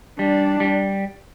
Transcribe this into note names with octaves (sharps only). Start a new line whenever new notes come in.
G3 D4
G3